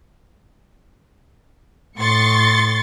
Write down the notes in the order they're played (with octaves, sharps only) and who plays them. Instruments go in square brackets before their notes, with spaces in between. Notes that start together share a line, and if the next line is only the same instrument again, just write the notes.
[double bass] A2 [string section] C6 C#6 A6